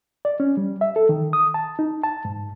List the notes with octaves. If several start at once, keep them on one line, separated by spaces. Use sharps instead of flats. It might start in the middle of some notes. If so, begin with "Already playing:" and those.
D5
C#4
G3
E5
A4
D#3
D#6
A5
D#4
A5
G#2